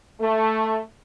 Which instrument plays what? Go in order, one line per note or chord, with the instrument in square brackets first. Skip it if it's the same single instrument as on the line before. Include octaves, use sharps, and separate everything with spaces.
[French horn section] A3